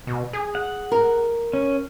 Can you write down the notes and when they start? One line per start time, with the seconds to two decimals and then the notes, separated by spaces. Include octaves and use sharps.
0.07 B2
0.33 G#4
0.55 F#5
0.92 A#4
1.53 C#4